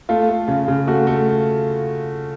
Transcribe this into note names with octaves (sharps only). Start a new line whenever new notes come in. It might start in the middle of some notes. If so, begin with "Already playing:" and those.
A3 F4
A3
C#3
C#3
A3 F#4
A3